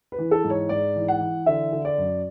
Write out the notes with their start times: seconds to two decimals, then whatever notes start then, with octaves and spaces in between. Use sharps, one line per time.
0.12 B4
0.18 E3
0.31 A4
0.44 G#2
0.50 C#5
0.69 G#2 D5
0.96 E3
1.08 F#5
1.21 E3
1.46 D3 E5
1.73 D3
1.85 D5
1.98 F#2